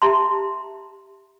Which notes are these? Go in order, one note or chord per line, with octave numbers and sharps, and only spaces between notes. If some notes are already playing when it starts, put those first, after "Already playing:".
G4 E5 A5 A#5 C6